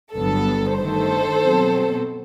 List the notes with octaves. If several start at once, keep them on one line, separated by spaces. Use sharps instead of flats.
G1 G2 F#3 B3 A4
G2 D#3 A3 A4 C5
B2 F#3 C4